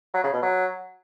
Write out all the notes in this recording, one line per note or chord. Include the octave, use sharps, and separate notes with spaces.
F#3
C#3
B2
F#3